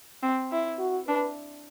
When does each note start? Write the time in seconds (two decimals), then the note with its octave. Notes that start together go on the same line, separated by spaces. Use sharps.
0.23 C4
0.51 E4
0.79 F#4
1.07 D4 B4